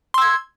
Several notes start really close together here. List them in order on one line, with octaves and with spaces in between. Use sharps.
C6 E6 G#6